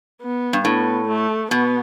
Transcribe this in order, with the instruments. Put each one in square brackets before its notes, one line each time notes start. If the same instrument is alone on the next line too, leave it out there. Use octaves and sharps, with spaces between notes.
[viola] B3
[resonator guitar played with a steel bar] G2
[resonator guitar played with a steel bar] A2 [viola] B3
[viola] A3
[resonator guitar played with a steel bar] B2 [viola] B3